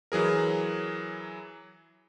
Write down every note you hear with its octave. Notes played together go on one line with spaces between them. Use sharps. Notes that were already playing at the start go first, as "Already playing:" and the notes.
E3 F#3 G#4 A#4